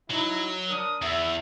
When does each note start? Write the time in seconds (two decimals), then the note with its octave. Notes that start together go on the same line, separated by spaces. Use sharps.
0.11 F#3 D#4 E4
0.68 D4 A#4 D#6
1.02 E2 E5